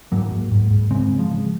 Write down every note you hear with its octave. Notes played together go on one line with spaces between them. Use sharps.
G#2 F#3 A#3
G#2
G#2
G#2
C#3 G#3 C4
C#3
F3 G#3
C#3